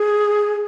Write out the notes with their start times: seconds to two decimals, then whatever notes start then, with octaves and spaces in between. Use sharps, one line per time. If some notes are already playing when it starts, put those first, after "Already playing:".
Already playing: G#4